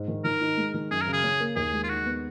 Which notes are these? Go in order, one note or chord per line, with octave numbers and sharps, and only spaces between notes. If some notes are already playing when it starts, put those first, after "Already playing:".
Already playing: G#2
D#3
D#3 A#4
D#4
G#3
D#3
F#2 G#4
A#4
C#3
G#4
C#4
A#3
D#2 G#4
G#3
F4
D#4 F#4
B3